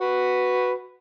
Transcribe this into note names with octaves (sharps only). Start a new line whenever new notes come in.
F#4 B4